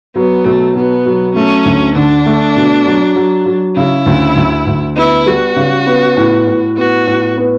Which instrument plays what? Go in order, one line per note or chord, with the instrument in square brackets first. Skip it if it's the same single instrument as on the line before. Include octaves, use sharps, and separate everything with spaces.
[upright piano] F#3 [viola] B3
[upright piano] B2 [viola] A3
[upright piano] B2 [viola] B3
[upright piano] F#3
[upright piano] A3 [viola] C#4
[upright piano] D2
[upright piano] D3 [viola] D4
[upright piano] A3
B2
F#3
F#3
F#3
[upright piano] C#3 [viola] E4
[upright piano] D2
D2
D2
[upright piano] B3 [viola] E4
[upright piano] G3 [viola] F#4
[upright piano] C#3
B3
A2
A2
[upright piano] B3 [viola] F#4
[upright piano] A2
B3